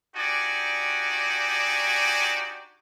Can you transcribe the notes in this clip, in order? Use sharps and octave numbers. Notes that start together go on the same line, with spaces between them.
D4 D#4 F#4 G4 D5 G#5